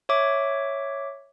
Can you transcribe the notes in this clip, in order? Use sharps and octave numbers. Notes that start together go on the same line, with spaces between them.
C#5 E5 D6